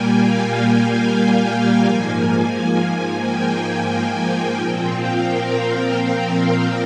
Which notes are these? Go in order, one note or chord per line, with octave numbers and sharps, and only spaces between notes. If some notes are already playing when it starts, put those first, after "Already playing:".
Already playing: A#2 G3 A#3 G5 G#5
F5
G#2 F3 A#3 G#5
G5
A#2 F3 C4 G5
F5
A#4